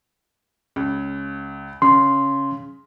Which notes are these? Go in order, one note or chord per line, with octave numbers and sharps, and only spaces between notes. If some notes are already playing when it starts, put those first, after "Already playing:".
C#2
C#3 C6